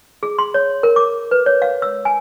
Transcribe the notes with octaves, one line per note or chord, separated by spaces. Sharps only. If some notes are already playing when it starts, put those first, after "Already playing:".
G#4
C6
C#5
A#4
D6
B4
C#5
F5
E6
G#5